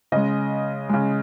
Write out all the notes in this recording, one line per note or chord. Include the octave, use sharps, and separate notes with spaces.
C#3 G#3 D#5
C#3 G#3